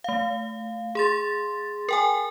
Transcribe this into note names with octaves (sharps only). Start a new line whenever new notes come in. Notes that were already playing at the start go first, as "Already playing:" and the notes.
A3 F5
G#4 C6 A6
A#4 G5 G#5